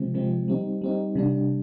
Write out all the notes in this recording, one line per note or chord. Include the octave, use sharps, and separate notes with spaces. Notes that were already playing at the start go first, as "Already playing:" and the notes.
Already playing: C3 F3 G#3 C4
C3 F3 G#3 C4
G3 C4 D#4
G3 C4 D#4
C3 G3 D4